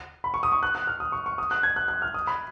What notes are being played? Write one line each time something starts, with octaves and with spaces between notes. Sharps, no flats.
B5
C#6
D#6
C#6
F#6
F#6
F6
D#6
C#6
C#6
D#6
F#6
G#6
F#6
F#6
F6
D#6
B5